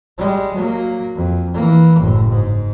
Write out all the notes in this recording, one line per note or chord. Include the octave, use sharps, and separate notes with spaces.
G3 G#3
F#3 A#3
F2
E3 A#3
F#1 A2
G#2